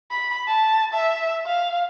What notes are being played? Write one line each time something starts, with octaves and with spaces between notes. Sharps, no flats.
B5
A5
E5
F5